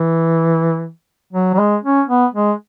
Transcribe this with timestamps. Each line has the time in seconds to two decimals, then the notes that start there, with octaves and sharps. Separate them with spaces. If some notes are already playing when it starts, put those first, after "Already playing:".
Already playing: E3
1.33 F#3
1.54 F#3
1.59 G#3
1.84 C#4
2.08 B3
2.34 G#3